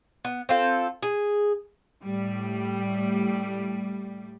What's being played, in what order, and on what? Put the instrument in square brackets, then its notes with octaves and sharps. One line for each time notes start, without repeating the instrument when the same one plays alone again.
[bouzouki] B3
C4 F4 A4
G#4
[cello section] A2 G3